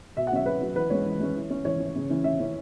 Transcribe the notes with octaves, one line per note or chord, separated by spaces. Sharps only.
B2 E5
F#5
F#3 C#4 E5
B2 B4
F#3 C#4
E3 B4
G#3 C#4 C#5
E3
G#3 C#4
E3
C#4
E3 C#5
C#4
C#3
E3 C#4
C#3 E5
E3 C#4